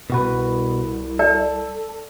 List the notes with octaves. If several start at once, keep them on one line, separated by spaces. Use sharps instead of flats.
C2 B2 F#4 B4
A4 D5